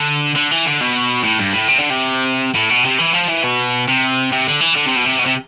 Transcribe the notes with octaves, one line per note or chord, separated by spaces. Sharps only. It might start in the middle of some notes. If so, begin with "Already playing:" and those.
Already playing: D3
D3
E3
D3
B2
A2
G2
A2
C3
D3
C3
A2
B2
C3
E3
F3
E3
B2
C3
C3
D3
E3
D3
C3
B2
C3
B2
C3